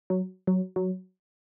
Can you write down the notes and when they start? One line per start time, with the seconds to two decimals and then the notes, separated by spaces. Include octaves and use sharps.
0.10 F#3
0.47 F#3
0.76 F#3